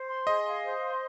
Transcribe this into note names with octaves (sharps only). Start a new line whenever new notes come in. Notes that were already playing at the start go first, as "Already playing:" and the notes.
Already playing: C5
C6
G#4 D#5
F5
C5
C6